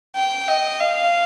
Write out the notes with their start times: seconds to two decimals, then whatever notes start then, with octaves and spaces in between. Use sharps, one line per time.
0.16 G5
0.48 D#5
0.80 F5